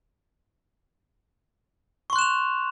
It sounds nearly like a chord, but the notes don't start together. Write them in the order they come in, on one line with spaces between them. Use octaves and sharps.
C#6 C6 F#6 E7 F7